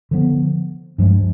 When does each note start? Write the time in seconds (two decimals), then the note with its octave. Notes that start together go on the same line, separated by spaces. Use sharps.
0.11 D3 F3 B3
0.98 G2 F3 G#3